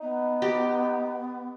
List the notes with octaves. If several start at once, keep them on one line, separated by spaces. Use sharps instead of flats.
B3 D#4
G4